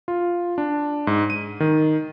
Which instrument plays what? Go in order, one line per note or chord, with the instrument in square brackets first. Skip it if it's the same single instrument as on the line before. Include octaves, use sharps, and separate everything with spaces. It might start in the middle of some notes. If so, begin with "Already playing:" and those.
[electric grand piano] F4
D4
G#2
D#7
D#3